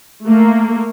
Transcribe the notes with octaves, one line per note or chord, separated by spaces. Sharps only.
A3 A#3